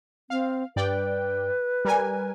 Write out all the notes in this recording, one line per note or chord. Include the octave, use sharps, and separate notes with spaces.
C4 F5
G2 B4 D5 G5
G3 A#4 G#5